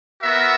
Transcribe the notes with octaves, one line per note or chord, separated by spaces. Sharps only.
B3 F#4 A#4 E5